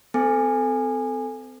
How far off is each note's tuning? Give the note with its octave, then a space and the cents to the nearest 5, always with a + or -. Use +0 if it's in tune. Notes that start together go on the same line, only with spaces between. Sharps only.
C4 -35 A4 +0 G#5 -10